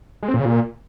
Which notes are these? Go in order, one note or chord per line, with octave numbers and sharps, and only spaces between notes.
G#3
C4
A#2
C#3
A#2